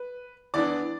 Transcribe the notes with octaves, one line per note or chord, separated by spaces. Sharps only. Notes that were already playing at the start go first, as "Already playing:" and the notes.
Already playing: B4
E2 E3 B3 D4 D5 D6